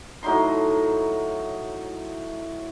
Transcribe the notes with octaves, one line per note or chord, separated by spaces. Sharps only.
A2 F#3 D#4 C6